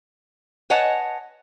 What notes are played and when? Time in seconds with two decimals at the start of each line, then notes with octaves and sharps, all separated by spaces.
0.70 B4 C#5 D#5 F#5 G#5 A5